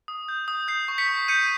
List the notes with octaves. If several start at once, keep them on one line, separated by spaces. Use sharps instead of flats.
D#6
G6
D#6
G6 C7
C#6
B6 C#7
C#6
G6 C#7 D#7